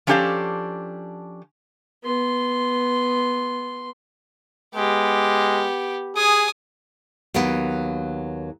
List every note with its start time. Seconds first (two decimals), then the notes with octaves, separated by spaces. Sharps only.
0.07 F3 C#4 D4 G4 A4 F5
2.03 B3 C6
4.75 G#3 B3 G4
6.16 G#4 G#5 D#6
7.34 D#2 F#3 A#3 B3